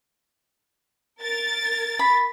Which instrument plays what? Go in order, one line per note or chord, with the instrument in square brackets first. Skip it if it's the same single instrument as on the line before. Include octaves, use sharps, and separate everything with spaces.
[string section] A#4 A6
[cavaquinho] B5